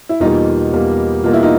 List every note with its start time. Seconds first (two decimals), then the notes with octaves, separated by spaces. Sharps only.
0.09 E4
0.20 E2 B2 G3 A#3 D#4 F4
0.73 E2 B2 G3 A#3
1.24 E2 B2 G3 A#3 F4
1.33 E4
1.43 D#4 F4